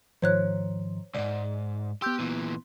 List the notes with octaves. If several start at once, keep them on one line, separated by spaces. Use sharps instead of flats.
G#2 D#3 F3 C5 C#5 F#6
C2 G#2 D5
B3 G4 C6 E6 G6
A#2 E3